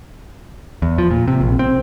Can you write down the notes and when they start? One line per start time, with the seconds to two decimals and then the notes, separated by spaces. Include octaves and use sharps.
0.82 E2
0.98 F3
1.11 A#2
1.28 C3
1.41 A#1
1.59 C4